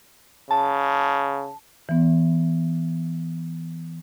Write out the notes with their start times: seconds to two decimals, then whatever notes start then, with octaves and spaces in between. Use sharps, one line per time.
0.51 C#3 A5
1.89 E3 B3